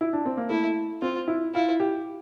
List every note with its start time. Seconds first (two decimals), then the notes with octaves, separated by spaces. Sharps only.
0.01 E4
0.13 D4
0.26 C4
0.37 A#3
0.49 A3 E4
1.02 C4 F4
1.28 E4
1.55 E4 F4
1.80 G4